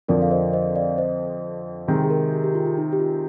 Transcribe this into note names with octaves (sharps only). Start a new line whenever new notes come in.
F2 D3 F3 A#4 D5
F5
C5 D#5
C5 D#5
D5 F5
C5 D#5
C3 D#3 G#3 C4
G#4
A#4
G4
G4
F4
F4
D#4
G4
F4